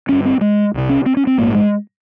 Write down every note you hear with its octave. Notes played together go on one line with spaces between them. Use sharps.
G1 G2 C#4
C4
G#3
C2 C3
C#4
C4
C#4
C4
A#1 G#2 A#3
G#3